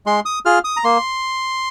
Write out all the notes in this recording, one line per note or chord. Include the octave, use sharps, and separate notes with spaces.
G#3 C6
D#6
F4 G#4 F6
D#6
A#5
A#3 C6